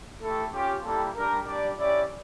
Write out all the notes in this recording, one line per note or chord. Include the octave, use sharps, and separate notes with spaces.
A3 E4 G4 A4
C#4 F4 G4
G3 A#3 E4 G4 A4
G3 D4 G4 A#4
G3 D4 G4 D5
C#4 E4 G4 D5